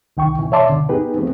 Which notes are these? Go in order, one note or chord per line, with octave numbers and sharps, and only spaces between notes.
C2 D#3 G5 C#6
B2 E3
C#5 D5 E5 A5 C6 D6
B2 D3
B3 D#4 G4 G#4 B4
F3 A3 B3 C4